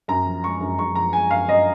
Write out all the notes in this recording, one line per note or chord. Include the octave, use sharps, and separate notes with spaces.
F#2 A#5
F3
G#3 C#6
F#2
F#2 C#6
F3 A#5
G#3 G#5
F#2 F5
F#2 D#5